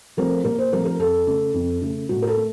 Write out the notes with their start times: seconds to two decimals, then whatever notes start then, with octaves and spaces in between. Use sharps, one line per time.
0.17 F3 A3 C4 F4 A#4
0.44 A#2 A#4
0.58 C5
0.72 F3 A3 C4 F4 A#4
0.85 A#4
0.99 F2 A4
1.27 C#3 A3
1.54 F2
1.82 C#3 A3
2.09 A2 F#4
2.22 A#4
2.27 A4
2.37 A3